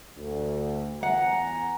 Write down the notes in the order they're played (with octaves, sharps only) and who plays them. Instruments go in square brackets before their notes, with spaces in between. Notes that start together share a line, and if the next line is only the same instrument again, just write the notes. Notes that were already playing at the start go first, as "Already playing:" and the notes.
[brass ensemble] D2
[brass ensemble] E2 G#5 A#5 [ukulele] F#5